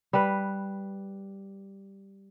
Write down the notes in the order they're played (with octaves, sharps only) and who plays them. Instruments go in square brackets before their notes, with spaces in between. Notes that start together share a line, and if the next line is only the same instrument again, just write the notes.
[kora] G3 B4